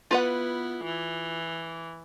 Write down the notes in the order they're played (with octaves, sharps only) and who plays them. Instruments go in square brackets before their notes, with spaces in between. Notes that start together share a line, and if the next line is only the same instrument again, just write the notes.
[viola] B3 E4 [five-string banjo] F4 B4 F#5
[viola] E3